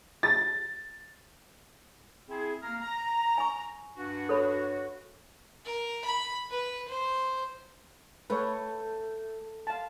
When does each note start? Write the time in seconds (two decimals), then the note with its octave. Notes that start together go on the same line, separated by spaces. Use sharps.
0.23 A6
2.28 C4 E4 G#4
2.61 A#3 A#5 F6
2.81 A#5
3.38 G#5 C#6
3.96 G2 F#4
4.29 A4 C#5 B5
5.65 A#4
6.05 B5
6.50 B4
6.88 C5
8.30 A3 B4 C#5
9.67 F5 A5